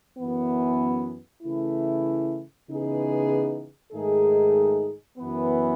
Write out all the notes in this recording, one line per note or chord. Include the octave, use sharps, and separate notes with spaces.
F#2 E3 B3
C#3 E3 A3 E4
C#3 E3 B3 D#4 G#4
G#2 D#3 A3 D#4 G#4
F#2 E3 B3